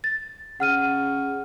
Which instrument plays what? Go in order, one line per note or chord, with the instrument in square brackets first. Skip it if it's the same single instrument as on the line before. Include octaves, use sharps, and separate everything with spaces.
[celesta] A6
[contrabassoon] C#3 [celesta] F#5 F6 D#7